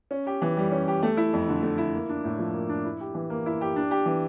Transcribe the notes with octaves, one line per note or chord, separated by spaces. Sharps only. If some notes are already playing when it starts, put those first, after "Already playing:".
C#4
G4
E3
G3
C#4
G4
A3
E4
F2
D3
A3
E4
A#3
D4
A2
F3
A#3
D4
E4
G4
E3
A#3
E4
G4
D4
G4
E3